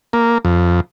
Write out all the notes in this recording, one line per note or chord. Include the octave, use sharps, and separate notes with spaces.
A#3
F2